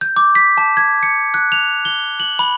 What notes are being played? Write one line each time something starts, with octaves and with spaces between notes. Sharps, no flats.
G6
D6
B6
A5
G#6
C#7
F#6
F7
G7
F#7
B5